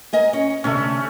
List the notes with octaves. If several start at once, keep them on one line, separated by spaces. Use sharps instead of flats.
A#4 D#5 G#5
C#4 C#5
D2 C3 A3 C#4